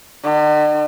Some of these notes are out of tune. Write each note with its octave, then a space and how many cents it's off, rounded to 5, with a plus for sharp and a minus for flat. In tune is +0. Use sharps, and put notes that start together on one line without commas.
D3 +45